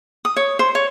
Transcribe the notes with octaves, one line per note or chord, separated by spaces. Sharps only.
D#6
C#5
C5
C#5